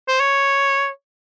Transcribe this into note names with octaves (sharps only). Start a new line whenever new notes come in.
C5
C#5